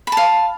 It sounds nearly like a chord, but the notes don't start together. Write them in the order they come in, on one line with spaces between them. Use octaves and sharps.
B5 A5 F5